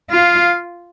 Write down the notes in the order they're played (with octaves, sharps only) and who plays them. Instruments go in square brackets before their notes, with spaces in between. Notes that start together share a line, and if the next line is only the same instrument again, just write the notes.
[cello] F4 [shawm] F5